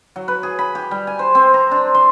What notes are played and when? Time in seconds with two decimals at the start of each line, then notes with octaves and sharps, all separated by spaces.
0.16 F#3
0.28 B4
0.43 G#4
0.59 B5
0.75 G4
0.91 G3
1.07 G#5
1.19 C5
1.35 C4
1.54 A#5
1.71 D4
1.95 C6